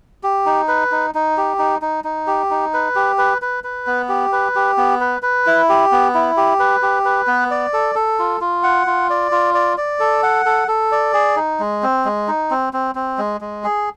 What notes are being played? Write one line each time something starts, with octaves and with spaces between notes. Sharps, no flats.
G4
D#4
B4
D#4
D#4
G4
D#4
D#4
D#4
G4
D#4
B4
G4
B4
B4
B4
B3
G4
B4
G4
B3
B4
B4
E4
G4
B3
E4
G4
B4
G4
B4
B3
D5
A4
A4
F4
F4
F#5
F4
D5
F4
D5
D5
A4
F#5
A4
A4
D5
G#4
D#4
G#3
C4
G#3
D#4
C4
C4
C4
G#3
G#3
G#4